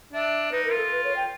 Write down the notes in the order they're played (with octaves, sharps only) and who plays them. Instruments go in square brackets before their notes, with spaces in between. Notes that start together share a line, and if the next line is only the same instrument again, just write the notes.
[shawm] D4 [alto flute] E5
[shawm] D#4 [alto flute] B4
[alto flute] A#4
[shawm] F4
[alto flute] A4
B4
C#5
G5